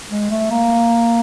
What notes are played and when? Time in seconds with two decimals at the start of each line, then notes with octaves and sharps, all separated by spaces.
0.11 G#3
0.31 A3
0.51 A#3